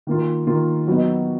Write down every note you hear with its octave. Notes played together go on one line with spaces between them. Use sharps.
D#3 A#3 F4
D#3 A#3 F4
F#3 B3 D#4